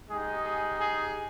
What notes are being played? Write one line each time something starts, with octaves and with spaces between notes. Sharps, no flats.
G#3 D#4 G4 G#4
G#4
G#4